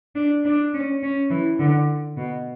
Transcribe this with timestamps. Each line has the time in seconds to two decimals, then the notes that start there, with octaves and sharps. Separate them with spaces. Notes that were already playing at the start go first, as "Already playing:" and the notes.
0.15 D4
0.45 D4
0.74 C#4
1.03 C#4
1.31 E3
1.59 D3
2.17 B2